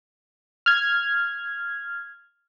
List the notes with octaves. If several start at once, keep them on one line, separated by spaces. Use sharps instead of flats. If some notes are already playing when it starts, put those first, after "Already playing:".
F6 G#6